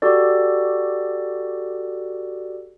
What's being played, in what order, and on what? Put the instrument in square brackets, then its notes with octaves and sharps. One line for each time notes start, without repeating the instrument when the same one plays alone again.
[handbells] F#4 G4 A4 D5